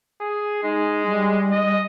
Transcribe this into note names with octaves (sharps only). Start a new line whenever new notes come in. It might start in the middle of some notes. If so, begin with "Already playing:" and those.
G#4
G#3 D#4
G3
D#5